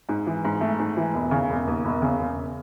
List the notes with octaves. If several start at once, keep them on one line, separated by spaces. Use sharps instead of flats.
G#2
E3
G#2
A3
G#2
E3
E1
C#3
E1
D#2
E1
C#3
E1